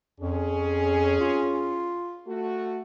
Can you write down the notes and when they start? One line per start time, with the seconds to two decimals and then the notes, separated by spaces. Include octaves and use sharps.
0.20 F2 C#4 G#4
1.20 F4
2.27 A3 F#4